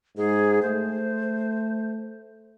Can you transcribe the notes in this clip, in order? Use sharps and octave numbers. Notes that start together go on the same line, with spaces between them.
G#2 G#4
A3 C5